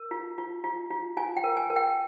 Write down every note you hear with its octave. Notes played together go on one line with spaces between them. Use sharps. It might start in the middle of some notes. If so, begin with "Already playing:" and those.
Already playing: A#4
F4
F4
F4
F4
F4 G#5
G5
A#4
G#5
A#4
G5